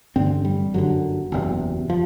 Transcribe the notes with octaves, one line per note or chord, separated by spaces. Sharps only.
A1 G2 D3 C4
G3
G1 F#2 D3 F#3
F#1 E2 C3
F3